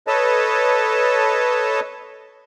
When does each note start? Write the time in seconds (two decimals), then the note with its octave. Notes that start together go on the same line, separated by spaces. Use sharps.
0.07 A4 B4 C#5 D#5 A5